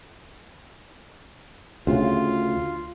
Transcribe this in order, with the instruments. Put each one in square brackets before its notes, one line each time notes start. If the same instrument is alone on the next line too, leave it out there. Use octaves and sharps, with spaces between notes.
[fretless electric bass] D2 C#3 [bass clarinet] F4